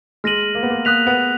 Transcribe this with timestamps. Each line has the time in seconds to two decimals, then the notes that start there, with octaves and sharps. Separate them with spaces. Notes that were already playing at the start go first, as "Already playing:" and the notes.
0.24 G#3 F6 A#6 D#7 F#7
0.55 A#3
0.63 B3
0.70 A#3
0.85 A#3 D#6 F#6 B6 F7
1.07 B3